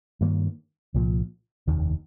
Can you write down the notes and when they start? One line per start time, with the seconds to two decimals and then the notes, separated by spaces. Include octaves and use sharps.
0.21 G2 D#3 A#3
0.94 C2 A#2 F3
1.67 F1 D#2 D#3